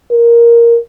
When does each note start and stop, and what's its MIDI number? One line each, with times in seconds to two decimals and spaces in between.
0.11 0.78 70